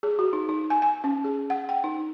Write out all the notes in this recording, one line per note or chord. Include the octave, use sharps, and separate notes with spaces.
G#4
F#4
D#4
D#4
G#5
G#5
C#4
G#4
F#5
G5
D#4